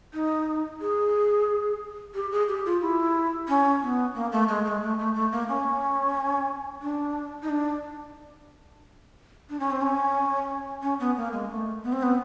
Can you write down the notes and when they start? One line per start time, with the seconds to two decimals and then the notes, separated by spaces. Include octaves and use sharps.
0.14 D#4
0.81 G#4
2.15 G4
2.32 G#4
2.49 G4
2.65 F4
2.81 E4
3.49 C#4
3.82 B3
4.15 A#3
4.32 A3
4.48 G#3
4.65 G#3
4.82 A3
4.99 A3
5.15 A3
5.32 A#3
5.49 C#4
6.82 D4
7.43 D#4
7.49 D4
9.50 D4
9.60 C#4
9.71 C4
9.81 C#4
10.82 C#4
11.00 B3
11.17 A#3
11.33 G#3
11.50 A3
11.83 B3
11.93 C4
12.03 B3